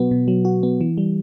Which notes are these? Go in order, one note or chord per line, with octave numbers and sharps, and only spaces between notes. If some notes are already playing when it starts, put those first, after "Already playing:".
Already playing: B2 F#3 B3 F#4
B2
F#3
F#4
B3
E3
G3